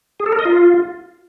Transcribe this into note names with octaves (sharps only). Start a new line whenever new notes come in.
G#4
A4
A#4
D#5
F4